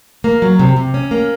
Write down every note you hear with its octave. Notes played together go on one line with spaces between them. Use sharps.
A#3
F#3
C3
C3
C#4
A#3